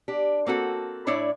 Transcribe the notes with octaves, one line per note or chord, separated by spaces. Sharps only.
D4 G4
A#3 C4 F#4 A4
A2 D4 E4 C#5 D5